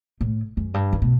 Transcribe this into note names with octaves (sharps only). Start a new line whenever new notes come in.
A2
F#2
G2
D#3
B2